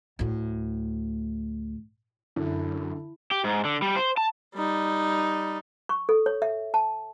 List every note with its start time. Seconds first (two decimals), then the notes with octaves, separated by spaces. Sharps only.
0.19 D2 A2
2.36 F#2 D3 E4
3.31 G4
3.44 G#2
3.65 D3
3.82 G3
3.96 C5
4.17 A5
4.55 G3 D#4
5.89 C#6
6.09 A4
6.26 C#5
6.42 E5
6.74 A5